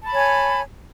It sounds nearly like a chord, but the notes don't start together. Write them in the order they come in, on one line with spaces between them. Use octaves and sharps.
A5 B5 C#5 G#5